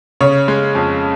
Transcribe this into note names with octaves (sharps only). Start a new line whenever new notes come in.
C#3 C#5
G#3
F2